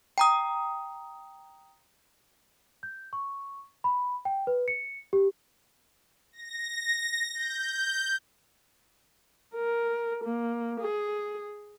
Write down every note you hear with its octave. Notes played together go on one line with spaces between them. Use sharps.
G5 A#5 D#6
G6
C#6
B5
G5
B4
C#7
G4
A#6
G6
A#4
A#3
G#4